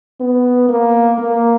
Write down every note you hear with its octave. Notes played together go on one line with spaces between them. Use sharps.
B3
A#3
A#3